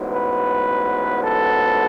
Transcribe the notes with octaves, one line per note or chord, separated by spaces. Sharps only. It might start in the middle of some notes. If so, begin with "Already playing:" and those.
Already playing: A1 G#2 F#3 B3
B4
A4